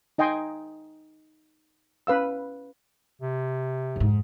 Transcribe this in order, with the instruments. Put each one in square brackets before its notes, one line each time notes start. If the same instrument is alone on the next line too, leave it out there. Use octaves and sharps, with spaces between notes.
[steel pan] D#4 D#5 G5 G#5 C6
C#4 B4 F5 E6
[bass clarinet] C3
[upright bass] F2 G#2